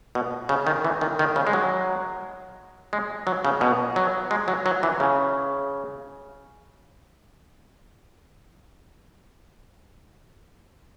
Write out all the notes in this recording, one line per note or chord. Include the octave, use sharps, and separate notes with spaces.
B2
C#3
D#3
E3
D#3
D#3
C#3
G#3
F#3
G#3
F#3
C#3
B2
F#3
G#3
F#3
F#3
E3
C#3